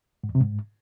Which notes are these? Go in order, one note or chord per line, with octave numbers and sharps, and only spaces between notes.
G#2
E2
C3
G#2